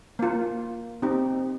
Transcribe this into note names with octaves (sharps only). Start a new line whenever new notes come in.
A#3 F4
C4 D#4 G4